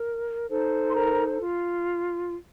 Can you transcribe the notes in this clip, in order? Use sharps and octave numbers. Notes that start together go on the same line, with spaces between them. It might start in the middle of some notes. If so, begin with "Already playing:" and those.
Already playing: A#4
D#4 A4 C5
C6
A#4 A#5
F4